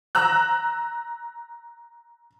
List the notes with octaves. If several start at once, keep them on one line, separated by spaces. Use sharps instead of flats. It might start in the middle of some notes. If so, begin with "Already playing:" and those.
A#5 E6 F#6